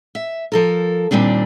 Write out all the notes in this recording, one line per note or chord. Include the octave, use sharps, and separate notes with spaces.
E5
F3 A4 A#4
D#2 A#2 G3 C4 D4